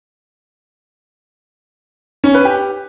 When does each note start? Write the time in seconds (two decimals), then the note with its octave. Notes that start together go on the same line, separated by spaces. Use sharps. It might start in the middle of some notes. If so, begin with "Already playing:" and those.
2.24 C#4
2.34 B4
2.45 G4